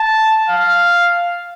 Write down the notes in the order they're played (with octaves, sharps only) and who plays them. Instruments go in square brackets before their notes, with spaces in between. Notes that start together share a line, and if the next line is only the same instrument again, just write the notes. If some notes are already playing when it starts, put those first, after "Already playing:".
Already playing: [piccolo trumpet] A5
F5